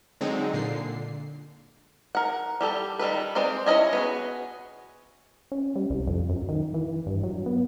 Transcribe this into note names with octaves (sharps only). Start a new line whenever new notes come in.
D3 F#3 G#3 C4 D#4
A#2 D3 C7
A#4 F#5
G3 G4 A4
D#3 G3 A4 B4
G#3 C4 C5 D5
C#4 E4 A#4 D#5 G#5
B3 F#4 G#4
C#4
G3
C2
F2
F#2
D#3
E3
G2
F#3
B3